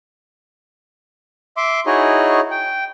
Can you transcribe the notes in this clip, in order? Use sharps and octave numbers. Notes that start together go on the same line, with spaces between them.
E5 C6 D6
D#4 E4 F#4 G#4 C#5 D#5
G5